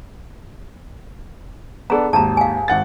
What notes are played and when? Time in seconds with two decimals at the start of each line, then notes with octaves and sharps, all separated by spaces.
1.90 B3 D4 G#4 A4 A#5
2.13 G#1 D#2 A5 A#5
2.37 F5 G#5
2.68 G#1 F#5 A6